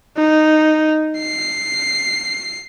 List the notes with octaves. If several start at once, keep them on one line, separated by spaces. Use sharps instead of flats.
D#4
C7